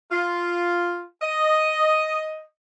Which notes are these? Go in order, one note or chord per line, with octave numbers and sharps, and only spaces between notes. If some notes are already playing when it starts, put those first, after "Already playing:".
F4
D#5